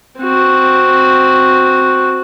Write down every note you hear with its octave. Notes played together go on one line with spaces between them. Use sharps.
C4 F#4